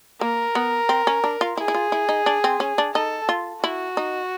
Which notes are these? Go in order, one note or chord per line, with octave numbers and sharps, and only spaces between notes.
A#3 A#4
B3
C4
C#4
D4
F4
E4 G#4
E4
F4
E4
D#4
D4
C4
C#4
D4
D#4 A4
F4
E4 F#4
D#4